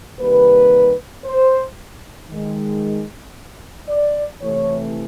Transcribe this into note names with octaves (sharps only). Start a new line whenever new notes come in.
C3 D#3 G3 A#3 B4
C5
D#3 G#3
D5
C3 E3 A3 C#5